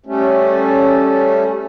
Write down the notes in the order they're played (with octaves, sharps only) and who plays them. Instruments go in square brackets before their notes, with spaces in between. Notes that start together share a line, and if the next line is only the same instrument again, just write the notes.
[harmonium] G3 A3 C#4